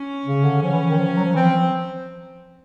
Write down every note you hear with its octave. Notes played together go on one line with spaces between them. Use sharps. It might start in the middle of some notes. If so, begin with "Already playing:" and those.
Already playing: C#4
C#3
D3
F3 C#4
E3
D#3
F3
F#3
F3
E3 C4
F3